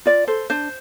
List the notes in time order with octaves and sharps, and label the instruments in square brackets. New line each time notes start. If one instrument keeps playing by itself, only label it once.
[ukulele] F4 D5
A4 C5
D4 C5